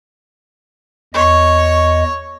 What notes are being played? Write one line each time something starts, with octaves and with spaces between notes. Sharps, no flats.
E2 C#5 D#5 C#6